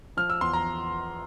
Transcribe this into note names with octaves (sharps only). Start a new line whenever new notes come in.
F3 F6
E6
E2 C6
A#5